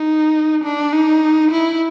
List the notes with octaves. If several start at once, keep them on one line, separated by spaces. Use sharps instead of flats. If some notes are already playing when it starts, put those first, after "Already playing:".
Already playing: D#4
D4
D#4
E4